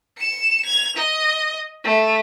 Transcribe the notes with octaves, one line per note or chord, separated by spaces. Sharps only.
C#7 E7
G#6 F7
D#5
A3